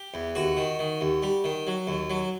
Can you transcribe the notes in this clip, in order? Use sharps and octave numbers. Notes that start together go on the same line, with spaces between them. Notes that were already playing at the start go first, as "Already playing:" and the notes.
Already playing: G4
E2
D#2 F#4
D#3
D#3
D#2
G3
D#3
F#3
D#2
F#3